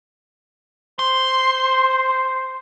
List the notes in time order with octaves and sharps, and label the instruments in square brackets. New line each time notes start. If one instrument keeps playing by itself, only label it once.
[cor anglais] C5 [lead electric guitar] C6